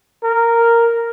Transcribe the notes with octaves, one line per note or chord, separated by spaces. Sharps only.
A#4